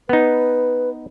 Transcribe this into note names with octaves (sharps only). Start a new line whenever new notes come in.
B3 D#4 B4